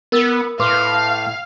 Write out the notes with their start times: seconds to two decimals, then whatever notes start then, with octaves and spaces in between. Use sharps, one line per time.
0.12 B3 A#4 E6 A6
0.60 A2 B4 F5 C6 D6